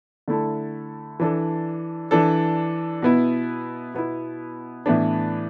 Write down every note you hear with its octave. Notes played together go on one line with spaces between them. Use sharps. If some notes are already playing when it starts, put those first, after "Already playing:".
D3 A3 E4 A4
E3 D4 A4
E3 D4 A4
B2 B3 E4
B2 B3 E4
A2 E3 B3 D4